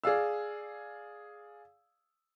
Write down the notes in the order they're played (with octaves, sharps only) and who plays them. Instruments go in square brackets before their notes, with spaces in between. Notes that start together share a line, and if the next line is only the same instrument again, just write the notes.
[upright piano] G#4 D5 F5 E6